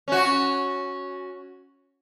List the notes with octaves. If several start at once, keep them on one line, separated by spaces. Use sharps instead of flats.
C#4 F#4